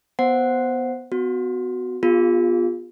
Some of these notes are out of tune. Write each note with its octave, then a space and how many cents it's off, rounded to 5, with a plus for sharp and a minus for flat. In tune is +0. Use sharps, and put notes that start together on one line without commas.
B3 +0 C5 +0 F#5 +0
B3 +30 F#4 +0
B3 -10 F4 +15 G#4 -40